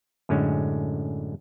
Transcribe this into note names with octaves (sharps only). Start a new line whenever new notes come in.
F#2 A2 D3 G#3 C#4